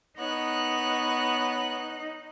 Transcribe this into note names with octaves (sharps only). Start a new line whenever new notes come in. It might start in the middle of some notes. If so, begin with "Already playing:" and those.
B3 D#4 C#5 F#6